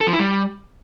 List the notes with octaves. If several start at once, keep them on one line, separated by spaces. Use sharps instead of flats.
A4
F3
E4
G3